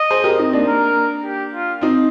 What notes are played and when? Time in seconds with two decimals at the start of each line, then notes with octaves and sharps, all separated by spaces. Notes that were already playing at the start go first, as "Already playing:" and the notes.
Already playing: D#5
0.11 G#4 C5
0.24 G4 A#4
0.39 C4 D#4
0.53 A#3 D4
0.68 A#4
1.24 G4
1.54 F4
1.81 C4 D#4